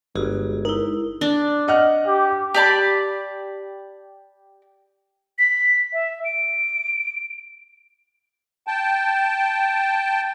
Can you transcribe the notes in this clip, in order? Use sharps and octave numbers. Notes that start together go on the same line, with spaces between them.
G1 G#3 F#4 G#4
D#4 E4 A#4
D4
D#5 F#5 F6
G4
G4 D5 A5 B5
B6
E5
D7
G5 A5